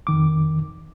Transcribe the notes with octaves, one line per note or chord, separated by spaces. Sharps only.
F2 D#3 D6